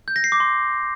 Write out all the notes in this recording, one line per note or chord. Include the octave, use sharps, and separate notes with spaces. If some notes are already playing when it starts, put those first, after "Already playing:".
G6
A#6
C7
D6
C6